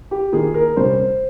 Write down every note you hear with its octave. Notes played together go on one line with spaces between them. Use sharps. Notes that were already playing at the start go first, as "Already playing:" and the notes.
G4
D#3 A#3 F4 G#4
A#4
C3 G3 C#4 C5